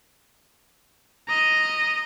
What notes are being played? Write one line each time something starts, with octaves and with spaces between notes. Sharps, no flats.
D#5 A#5